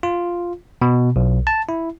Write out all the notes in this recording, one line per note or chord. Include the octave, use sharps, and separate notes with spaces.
F4
B2
B1
A5
E4